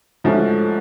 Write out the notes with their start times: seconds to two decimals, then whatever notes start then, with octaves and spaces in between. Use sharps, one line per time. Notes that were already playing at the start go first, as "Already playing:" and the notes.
0.24 G#2 F3 A3 C#4 F#4